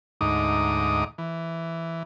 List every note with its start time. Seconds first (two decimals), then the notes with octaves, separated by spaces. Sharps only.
0.21 D2 G#2 D#4 D6 D#6
1.18 E3